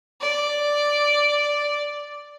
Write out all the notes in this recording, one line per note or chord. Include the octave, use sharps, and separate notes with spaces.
D5